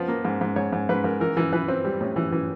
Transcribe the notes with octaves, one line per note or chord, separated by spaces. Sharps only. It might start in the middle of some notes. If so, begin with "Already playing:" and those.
Already playing: F3 B3
A#3
G#2
G#2
G#2 C#5
G#2
G#2 B4
G#2 A#4
E3 A#4
E3
E3 B4
C4
G3
A2
E3
E3